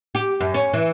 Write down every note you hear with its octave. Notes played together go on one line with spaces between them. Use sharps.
G4
F#2
C#4
E3